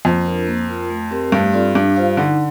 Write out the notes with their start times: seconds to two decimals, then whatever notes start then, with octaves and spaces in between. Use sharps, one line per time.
0.05 F2 A#3
0.26 D4 F4 A#4
0.47 A#3
0.69 F4 A#4
0.90 A3
1.11 C4 G4 A#4
1.32 G2 A3
1.53 C4 F4 A4 D5
1.75 G2 D4
1.96 F4 C5 F5
2.17 D3 D#4